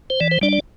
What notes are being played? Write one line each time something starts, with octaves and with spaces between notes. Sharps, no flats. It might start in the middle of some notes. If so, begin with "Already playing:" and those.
C5
E3 D5
C5
G3 D4 D5
D5